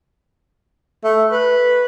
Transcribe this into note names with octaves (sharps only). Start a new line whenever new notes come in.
A3
B4